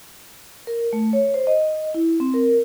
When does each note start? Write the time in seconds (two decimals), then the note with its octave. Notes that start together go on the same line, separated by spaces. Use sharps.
0.67 A#4
0.93 A3
1.13 C#5
1.34 C5
1.47 D#5
1.94 E4
2.20 C4
2.34 A#4